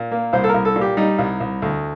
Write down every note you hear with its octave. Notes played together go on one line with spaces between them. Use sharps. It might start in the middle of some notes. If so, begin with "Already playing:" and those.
Already playing: A#2
A#3
C2 C5
A4
A#4
C2
A4
A#2
G4
G3 D#4
C2
C2
D2